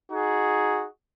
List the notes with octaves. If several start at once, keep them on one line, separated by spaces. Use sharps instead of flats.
D#4 F#4 G#4